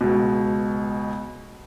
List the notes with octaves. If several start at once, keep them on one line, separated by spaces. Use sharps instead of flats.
C#2 B2